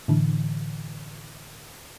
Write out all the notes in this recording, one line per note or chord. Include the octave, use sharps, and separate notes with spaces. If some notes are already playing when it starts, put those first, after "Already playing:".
A2 D3 E3